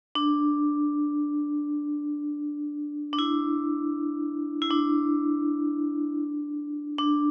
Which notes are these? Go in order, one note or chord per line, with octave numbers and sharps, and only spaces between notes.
D4
D4
E4
E4
D4
D4